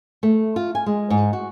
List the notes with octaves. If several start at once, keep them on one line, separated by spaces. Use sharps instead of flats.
A3
F4
G#5
G#3
G#2
F#4